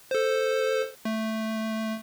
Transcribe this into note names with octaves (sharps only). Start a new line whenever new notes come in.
A4 C5
A3